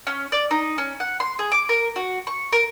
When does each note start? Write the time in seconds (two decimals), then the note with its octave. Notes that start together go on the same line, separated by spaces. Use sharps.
0.07 C#4
0.32 D5
0.51 D#4
0.78 C#4
1.00 F#5
1.20 C6
1.39 G#4
1.52 D6
1.69 A#4
1.96 F#4
2.27 C#6
2.52 A#4